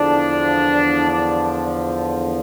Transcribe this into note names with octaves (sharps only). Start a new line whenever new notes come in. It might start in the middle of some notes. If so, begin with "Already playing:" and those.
Already playing: E2 D3 F3 D4
D4